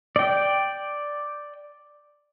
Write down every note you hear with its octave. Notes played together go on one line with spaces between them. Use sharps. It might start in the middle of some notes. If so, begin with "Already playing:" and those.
D5 G5